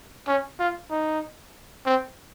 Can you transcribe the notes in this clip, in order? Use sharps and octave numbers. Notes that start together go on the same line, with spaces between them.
C#4
F4
D#4
C4